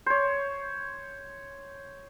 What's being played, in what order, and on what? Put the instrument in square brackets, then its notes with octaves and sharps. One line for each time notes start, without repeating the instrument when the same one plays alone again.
[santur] C5 C#5